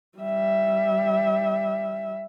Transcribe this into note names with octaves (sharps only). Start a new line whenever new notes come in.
G3 E5